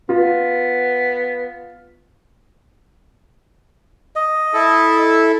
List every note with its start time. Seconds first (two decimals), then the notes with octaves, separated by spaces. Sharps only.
0.09 B3 F4
4.16 D#5
4.54 E4 A4